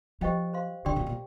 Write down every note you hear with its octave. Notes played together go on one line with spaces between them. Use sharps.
F3 G4 C5 D#5 G5
C5 F5 C6
D3 G4 D5 G5 C6
A#2
A#2